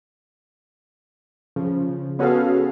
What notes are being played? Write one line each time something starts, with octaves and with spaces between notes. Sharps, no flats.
C#3 F3
B3 C#4 F#4 G#4 A4 F5